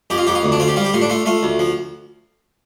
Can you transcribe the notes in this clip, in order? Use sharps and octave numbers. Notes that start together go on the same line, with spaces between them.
F2 G4
F4
F2 G4
F4
D2
D4
C4 F4
G4
G3 F4
G4
A2 F4
D4
A3 F4
A3 F4
D2
F3